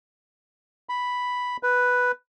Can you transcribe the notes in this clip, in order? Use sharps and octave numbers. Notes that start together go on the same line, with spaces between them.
B5
B4